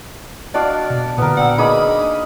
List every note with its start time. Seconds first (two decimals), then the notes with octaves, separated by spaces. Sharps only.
0.54 D4 F#4 D5 D#5 F5
0.90 B2
1.18 A#2 D3 B3 A#4
1.37 D5 F#5 G5 E6
1.58 A#3 D4 D#4 G#4 B4 B5 D6